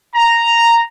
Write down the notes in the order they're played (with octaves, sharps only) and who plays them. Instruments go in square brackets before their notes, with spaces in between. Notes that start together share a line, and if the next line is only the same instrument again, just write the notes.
[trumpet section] A#5